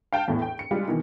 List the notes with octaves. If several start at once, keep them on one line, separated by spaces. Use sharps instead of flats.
F5 G5 A5
E2 A2 E3
G5
C#7
G3 G#3 F4
B2 D#3 E3